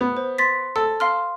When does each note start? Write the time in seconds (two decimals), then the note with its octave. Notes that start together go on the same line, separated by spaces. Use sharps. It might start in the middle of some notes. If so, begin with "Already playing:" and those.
0.01 B3
0.17 C5
0.38 C6 A6 B6
0.76 A4 E6
1.00 F5 C6 F6